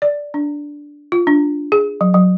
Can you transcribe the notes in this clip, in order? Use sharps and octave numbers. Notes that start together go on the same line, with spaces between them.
D5
D4
F4
D4
G#4
F#3
F#3